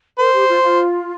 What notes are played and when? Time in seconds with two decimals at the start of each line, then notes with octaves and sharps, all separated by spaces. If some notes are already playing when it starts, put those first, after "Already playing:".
0.19 A#4 C5
0.33 G4
0.48 F4
0.63 F4